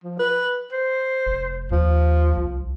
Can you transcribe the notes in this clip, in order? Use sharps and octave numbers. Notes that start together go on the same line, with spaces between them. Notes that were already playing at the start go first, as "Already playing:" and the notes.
F3
B4
C5
F1
D#2 F3
C2